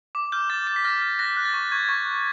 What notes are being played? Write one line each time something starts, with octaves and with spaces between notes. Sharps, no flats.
D6
F6 G6
D6 A6
D6 A6
B6
F6 A#6
F6
F#6 A#6
F#6
A6
C#6
C#6 G#6
C#6
F#6